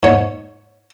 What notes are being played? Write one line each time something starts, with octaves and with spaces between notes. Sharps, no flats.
G#2 C#5